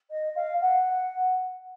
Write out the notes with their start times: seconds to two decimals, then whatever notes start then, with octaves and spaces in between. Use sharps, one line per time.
0.10 D#5
0.35 F5
0.61 F#5